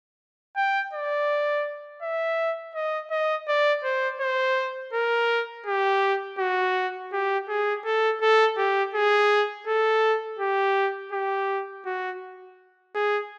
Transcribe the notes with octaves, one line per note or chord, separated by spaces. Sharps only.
G5
D5
E5
D#5
D#5
D5
C5
C5
A#4
G4
F#4
G4
G#4
A4
A4
G4
G#4
A4
G4
G4
F#4
G#4